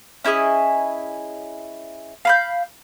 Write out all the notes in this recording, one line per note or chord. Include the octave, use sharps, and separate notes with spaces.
C#4 E4 G#4 D#5
F5 B5 G6